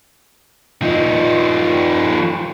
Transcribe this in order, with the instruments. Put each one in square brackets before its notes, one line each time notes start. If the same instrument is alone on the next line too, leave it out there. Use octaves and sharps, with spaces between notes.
[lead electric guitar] F3 D#4